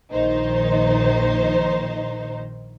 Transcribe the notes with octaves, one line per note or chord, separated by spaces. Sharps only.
A#1 D#3 D#4 C5